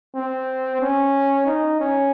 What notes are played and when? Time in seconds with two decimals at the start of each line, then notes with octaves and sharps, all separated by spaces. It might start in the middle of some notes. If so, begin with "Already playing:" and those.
0.15 C4
0.81 C#4
1.46 D#4
1.80 C#4